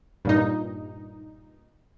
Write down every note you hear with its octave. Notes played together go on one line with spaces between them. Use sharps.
G2 A#2 D#4